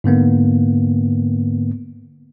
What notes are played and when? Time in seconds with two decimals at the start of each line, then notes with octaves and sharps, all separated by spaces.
0.04 G#2 D3 A#3 B3